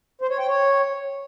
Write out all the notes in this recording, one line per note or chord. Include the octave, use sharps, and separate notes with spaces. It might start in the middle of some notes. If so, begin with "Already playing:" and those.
C5
C#5
G5
C#5